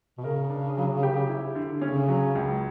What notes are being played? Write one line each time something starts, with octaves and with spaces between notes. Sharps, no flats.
B2
C#3 A#4
D4
F#3
G4
E4
D3
C#3 C#4
F#3
C#2